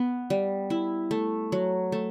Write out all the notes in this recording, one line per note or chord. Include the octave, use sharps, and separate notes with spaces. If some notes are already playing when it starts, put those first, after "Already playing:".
Already playing: B3
G3
E4
A3
F#3
A3